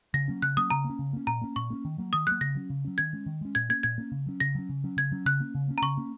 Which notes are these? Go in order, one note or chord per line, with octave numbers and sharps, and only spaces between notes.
C#3 A#6
F#3 A#3 C#4
C#3 F#6
F#3 A#3 C#4 D#6
C#3 A#5
A#3
C#4
C#3
A#3 C#4
A#2 A#5
A#3 C#4
A#2 C#6
A#3 C#4
D#3
F#3 A#3
D#3 D#6
F#3 A#3 F#6
C#3 A#6
F#3 C#4
C#3
F#3 C#4
D#3 G#6
G#3 C#4
D#3
G#3 C#4
A#2 G#6
A#3 C#4 G#6
A#2 G#6
A#3 C#4
C#3
F#3 C#4
C#3 A#6
F#3 C#4
C#3
F#3 C#4
C#3 G#6
F#3 C#4
C#3 F#6
A#3 C#4
C#3
A#3 C#4
A#5
C#3 C#6
A#3 C#4